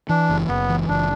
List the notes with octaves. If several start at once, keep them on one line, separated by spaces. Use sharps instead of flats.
E3 D4
F#1
F#1 B3
E3
F#1 D4